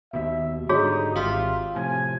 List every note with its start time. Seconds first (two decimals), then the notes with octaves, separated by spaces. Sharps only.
0.13 D#2 B2 E5
0.69 G#2 D3 G3 D#4 F#4 G#4 C#5
1.15 G#1 F4 G4 E5
1.75 A2 C3 F3 G#5